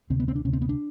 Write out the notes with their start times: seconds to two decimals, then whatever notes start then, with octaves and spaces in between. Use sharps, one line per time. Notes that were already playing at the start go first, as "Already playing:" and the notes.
0.10 D2 C3 C4
0.20 B3
0.28 C4
0.35 D4
0.45 D2 C3 C#4
0.53 C4
0.62 B3
0.69 D4